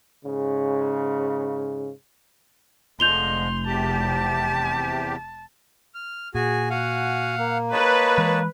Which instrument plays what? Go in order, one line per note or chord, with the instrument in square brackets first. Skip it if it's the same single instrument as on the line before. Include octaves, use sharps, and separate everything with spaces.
[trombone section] G#2 C#3
[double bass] F1 [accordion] D3 F3 G#3 [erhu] C6 [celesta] G6 F7 G7
[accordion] E2 C3 G4 [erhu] A5
[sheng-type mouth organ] F6
[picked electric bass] A#2 [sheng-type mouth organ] F#4 G#4 G#5
[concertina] F#4 G#5 [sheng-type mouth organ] F5 F#5
[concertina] A#3
[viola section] B4 [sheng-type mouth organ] C#5 D#5 A5
[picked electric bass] E3 G#3